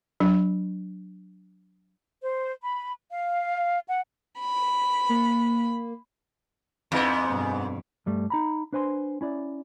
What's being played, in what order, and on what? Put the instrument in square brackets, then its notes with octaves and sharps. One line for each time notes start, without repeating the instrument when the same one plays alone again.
[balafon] F#3 D4
[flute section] C5
B5
F5
F#5
[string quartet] B5
[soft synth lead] A#3
[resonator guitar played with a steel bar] F2 [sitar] G#2 B3 [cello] E4
[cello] G2 B2
[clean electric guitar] G2 G3 A3
D#4 A#5 B5
D4 B4 C5 G#5 C6
C#4 E4 D5